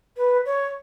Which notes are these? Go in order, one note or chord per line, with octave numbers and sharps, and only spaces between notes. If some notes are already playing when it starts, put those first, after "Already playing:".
B4
C#5